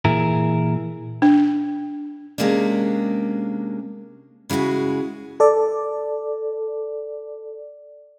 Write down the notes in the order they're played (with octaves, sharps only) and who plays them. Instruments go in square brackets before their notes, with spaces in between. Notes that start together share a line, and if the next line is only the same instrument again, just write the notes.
[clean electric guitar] A#2 E3 E4 G#4 A#4
[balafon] D4
[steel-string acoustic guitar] C3 G#3 A#3 C#4 D4
C#3 G#3 E4 F#4 G#4
[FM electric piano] A4 D5